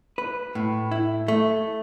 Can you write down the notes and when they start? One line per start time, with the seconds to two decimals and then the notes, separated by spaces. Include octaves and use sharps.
0.18 B4
0.55 A2
0.91 E4
1.28 A3